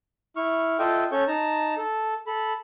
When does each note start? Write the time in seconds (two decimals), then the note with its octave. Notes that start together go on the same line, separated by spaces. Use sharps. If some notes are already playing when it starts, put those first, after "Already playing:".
0.36 E4 C#6 F6
0.79 F4 A4 D#5 E5 G5
1.12 C#4 A4 C#5 C#6 G6
1.28 D#4 A5 A#5
1.77 A4
2.27 A4 B5